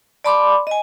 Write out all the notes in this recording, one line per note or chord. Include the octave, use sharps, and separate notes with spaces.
D5 A5 B5 C6 D6
D#5 G#5